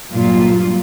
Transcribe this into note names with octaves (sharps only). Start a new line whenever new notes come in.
G2 A#2 F#3 G3 F4